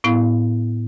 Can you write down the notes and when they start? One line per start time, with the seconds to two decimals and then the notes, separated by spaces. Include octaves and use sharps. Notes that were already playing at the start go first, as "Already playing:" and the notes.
0.04 A2 B3 E4 F5